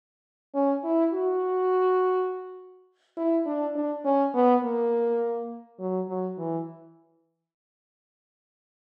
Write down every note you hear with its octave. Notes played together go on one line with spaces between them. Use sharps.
C#4
E4
F#4
E4
D4
D4
C#4
B3
A#3
F#3
F#3
E3